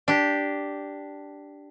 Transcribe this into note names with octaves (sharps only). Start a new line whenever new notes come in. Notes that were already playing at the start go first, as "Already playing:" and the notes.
D4 G4